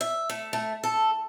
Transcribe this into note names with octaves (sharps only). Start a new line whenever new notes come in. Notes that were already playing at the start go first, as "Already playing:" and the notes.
E5
A3
A3
A4